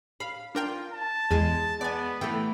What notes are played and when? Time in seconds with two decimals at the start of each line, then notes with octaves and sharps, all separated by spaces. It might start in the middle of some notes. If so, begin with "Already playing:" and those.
0.20 F5 B5
0.55 D4 F4 A#4 G5
0.92 A5
1.31 E2 G#3 G#5
1.81 B3 D5 G#5
2.21 E3 A3 G5